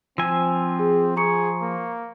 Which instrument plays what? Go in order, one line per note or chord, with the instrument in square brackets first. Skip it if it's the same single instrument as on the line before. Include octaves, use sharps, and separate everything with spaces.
[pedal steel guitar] F3 G#5 [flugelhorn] C4 [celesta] E6
[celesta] G#4
[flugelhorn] G#4 [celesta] A#5 C#6 C#7
[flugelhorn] A#3